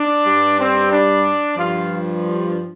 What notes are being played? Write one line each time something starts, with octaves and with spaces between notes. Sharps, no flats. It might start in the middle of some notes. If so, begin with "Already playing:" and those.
Already playing: D4
G2 G3
C4
D4
G2 F3 F4